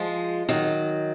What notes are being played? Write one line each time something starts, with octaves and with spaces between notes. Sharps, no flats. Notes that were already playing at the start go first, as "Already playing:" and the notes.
Already playing: F3 G#3
D#3 F#3